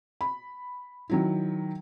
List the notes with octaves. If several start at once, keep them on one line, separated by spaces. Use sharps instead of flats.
B5
D#3 F#3 E4